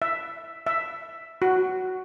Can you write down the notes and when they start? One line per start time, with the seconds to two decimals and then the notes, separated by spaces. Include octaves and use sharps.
0.02 E5
0.66 E5
1.42 F#4